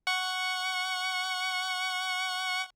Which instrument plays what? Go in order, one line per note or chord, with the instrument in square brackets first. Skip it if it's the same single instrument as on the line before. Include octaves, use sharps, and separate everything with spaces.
[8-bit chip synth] F#5 C#6